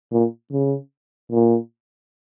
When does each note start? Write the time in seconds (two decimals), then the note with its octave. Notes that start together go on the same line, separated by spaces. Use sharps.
0.12 A#2
0.52 C#3
1.32 A#2